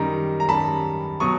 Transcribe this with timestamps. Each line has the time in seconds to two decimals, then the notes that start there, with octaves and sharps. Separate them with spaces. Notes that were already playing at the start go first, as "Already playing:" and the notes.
Already playing: F#2 D#3 G3 A#5
0.40 A#5
0.48 F#2 D#3 G3 A5 B5
1.20 B2 F#3 C#6 D#6